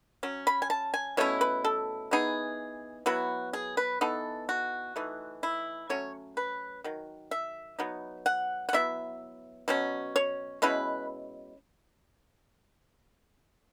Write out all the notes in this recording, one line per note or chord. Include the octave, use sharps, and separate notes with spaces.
F#3 C#4
B5
G#5
A5
G#5
B2 A3 C#4 E4 C#5
B4
A4
E3 B3 D#4 G#4
F#3 B3 E4 F#4
G#4
B4
E3 B3 D#4 A4
F#4
E3 A3 D#4
E4
F#3 A3 C#4 C#5
B4
D#3 F#3
E5
F#3 B3 D#4
F#5
F#5
F#3 B3 E4 E5
B2 F#3 C#4
C#5
B2 G#3 C#4 E4 B4